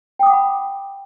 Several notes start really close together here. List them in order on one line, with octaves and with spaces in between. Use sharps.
G5 D#6 D6 F#5 B5